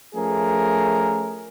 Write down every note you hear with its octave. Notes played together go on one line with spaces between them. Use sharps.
F3 A3 C#4 G#4 A#4